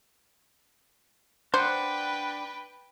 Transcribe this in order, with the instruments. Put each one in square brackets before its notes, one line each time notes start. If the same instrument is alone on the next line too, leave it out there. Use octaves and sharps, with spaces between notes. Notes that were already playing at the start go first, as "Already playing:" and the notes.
[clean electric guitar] D4 F#5 [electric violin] B4 G5 [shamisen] C5